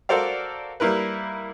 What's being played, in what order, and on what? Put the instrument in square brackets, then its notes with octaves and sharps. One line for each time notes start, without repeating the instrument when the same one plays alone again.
[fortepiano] F#4 A4 A#4 C5 D5 F5
G3 A#3 E4 A#4 B4